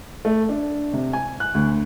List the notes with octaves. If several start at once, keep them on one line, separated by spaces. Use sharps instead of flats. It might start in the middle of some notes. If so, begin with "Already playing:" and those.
A3
D4
C3
G#5
F#6
D2